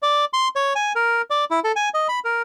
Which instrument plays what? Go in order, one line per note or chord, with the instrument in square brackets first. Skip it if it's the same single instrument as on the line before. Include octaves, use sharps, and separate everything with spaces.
[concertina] D5
C6
C#5
G#5
A#4
D5
E4
A4
G#5
D#5
B5
A#4